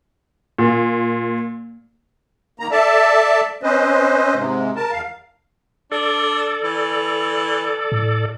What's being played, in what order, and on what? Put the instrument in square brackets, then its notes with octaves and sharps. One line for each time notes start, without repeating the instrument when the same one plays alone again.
[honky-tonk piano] A#2
[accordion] D#3 A#3 A#5
A4 D5 E5 A5
C4 C#4 B4 C5 D#5
G#2 C3 G#3
A#4 A5
E2 F5
[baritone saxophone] D4 [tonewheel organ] A4 D5
[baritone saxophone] E3
[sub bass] A2